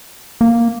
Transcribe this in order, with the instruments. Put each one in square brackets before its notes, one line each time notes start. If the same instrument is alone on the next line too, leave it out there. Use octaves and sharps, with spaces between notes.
[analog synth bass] A#3